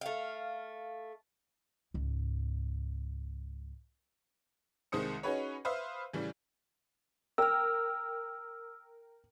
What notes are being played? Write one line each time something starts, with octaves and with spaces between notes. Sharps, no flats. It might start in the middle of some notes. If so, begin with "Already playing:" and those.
A3 F5
C#2 G#2
C2 D#3 G#3 C5 D#6 C#7
C#4 D#4 F#4 G#4 B4 C#5
B4 C5 E5 F5 D#6
A2 C#3 E3 G3
A#4 G5 E6 F6